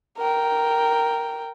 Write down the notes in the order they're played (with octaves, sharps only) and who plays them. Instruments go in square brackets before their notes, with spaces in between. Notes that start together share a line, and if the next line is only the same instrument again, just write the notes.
[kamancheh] A#4 G5